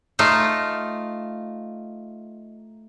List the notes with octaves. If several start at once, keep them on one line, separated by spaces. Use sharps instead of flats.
A3 D#4 F4